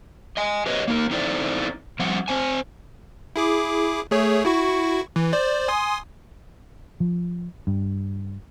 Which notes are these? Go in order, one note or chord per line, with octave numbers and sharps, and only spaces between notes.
D#5 G#5
G4 B4 C#5 D#5
A#3 D#4 A#4
C4 D#4 E4 A4 C5 D5
F3 G3 C4 F#5
C4 C5 G#5
E4 G#4 D6
A3 G#4 C#5
E4 F#4 C#6
E3
C5 D5
G#5 C6 D#6
F3
G2